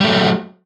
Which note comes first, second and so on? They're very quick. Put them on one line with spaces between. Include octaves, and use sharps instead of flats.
G3 A3 F#3